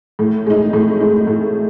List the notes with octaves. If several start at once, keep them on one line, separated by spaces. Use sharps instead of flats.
A2
G#3 D#4
A2
G#3 D#4
A2